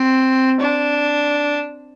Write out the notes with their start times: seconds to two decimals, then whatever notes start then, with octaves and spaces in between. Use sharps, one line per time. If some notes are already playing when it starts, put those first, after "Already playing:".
Already playing: C4
0.60 D4